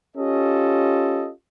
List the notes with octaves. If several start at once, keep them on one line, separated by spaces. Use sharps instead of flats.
C#4 F4 G4 A4 D#5